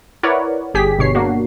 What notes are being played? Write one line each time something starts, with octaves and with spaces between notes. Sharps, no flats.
E4 A#4 B4 C#5 D5 F#5
G1 G4 G#4 B6
G1 B2 C#5 C7
A#3 D4 F#4